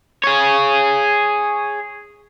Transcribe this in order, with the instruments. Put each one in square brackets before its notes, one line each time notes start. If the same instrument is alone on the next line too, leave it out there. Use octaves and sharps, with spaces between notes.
[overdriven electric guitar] G#4 C#5